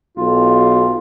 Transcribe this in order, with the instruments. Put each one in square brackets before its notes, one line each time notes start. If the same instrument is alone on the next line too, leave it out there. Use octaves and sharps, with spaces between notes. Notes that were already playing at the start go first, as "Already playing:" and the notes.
[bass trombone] B1 [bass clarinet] F4